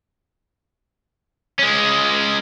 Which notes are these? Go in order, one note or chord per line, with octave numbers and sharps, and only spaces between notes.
G#3 C#4